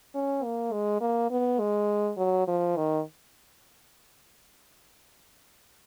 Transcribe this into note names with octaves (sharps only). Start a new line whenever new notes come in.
C#4
A#3
G#3
A#3
B3
G#3
F#3
F3
D#3